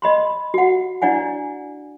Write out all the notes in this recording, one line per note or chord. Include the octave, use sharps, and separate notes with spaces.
D#5 B5 C6
F#4 F#5
D4 E4 D5 F#5 G#5